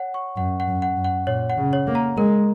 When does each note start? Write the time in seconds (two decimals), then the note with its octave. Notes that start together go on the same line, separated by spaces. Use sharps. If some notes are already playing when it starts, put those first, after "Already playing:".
Already playing: C#5 F#5
0.14 C#6
0.36 F#2 F#5
0.60 F#5
0.68 F#2
0.82 F#5
0.97 F#2
1.05 F#5
1.27 A#2 C#5
1.50 F#5
1.57 C#3
1.73 C#5
1.87 A#3
1.95 A#5
2.17 G#3 A#4